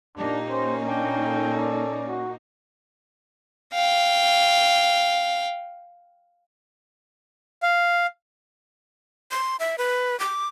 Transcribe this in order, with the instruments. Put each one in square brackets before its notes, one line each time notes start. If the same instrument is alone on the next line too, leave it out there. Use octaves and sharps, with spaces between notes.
[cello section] A#2 A#3 D#4 [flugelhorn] D4 [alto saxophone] G4
[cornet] C#4 [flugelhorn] C5
[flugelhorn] D4 [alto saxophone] G5
[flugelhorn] A4
[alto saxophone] D5
[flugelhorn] F#4
[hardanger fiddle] F5 G5
[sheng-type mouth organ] F5
[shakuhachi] C6
E5
B4
D6